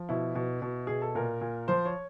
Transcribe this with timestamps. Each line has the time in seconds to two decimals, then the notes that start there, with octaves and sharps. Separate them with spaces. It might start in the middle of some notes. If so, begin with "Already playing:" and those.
Already playing: F3
0.09 B2 E4
0.35 B2
0.62 B2
0.87 B2 G#4
1.02 A4
1.15 A#2 A#4
1.41 A#2
1.68 F3 C5
1.86 C#5